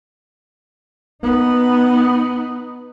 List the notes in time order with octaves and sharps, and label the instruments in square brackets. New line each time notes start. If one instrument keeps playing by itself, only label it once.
[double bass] B3 D#4